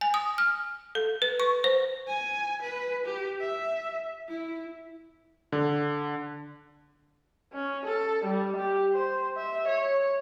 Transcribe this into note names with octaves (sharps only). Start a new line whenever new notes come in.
G#5
D#6
F6
A4
B4
C#6
C5
G#5
B4
G4
E5
E4
D3
C#4
A4
G3
G4
C5
E5
C#5